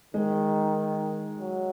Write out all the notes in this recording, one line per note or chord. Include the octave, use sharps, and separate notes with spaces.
D#3 G#3
F#3